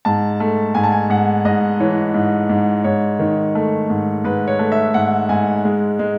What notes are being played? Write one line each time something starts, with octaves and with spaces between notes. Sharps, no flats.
G#2 A5
A3
G#2 G#5
A5
G#5
G#2 F#5
G#2 D#5
E3 C#5
G#2
G#2
G#2 C#5
D#3
A3
G#2
G#2 B4
C#5
A3
E5
G#2 F#5
G#2 G#5
G#3
G#3